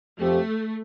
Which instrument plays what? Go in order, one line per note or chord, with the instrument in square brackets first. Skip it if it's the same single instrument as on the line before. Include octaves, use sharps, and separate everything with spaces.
[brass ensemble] F2 F3 C4 G4 [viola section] A3